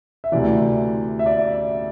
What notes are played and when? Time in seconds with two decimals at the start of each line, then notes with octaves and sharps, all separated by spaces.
0.24 E5
0.32 D2 C3 E3 D5
1.19 E5
1.26 D5